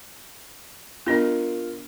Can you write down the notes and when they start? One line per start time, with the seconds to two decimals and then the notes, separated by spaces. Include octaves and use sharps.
1.07 B3 D4 F4 A#4 D#5